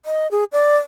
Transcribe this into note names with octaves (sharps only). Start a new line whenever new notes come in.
D#5
G#4
D5